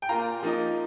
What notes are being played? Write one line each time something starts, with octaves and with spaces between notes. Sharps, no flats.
G5
A#2 A#3 F4 A#5
F3 A#3 D#4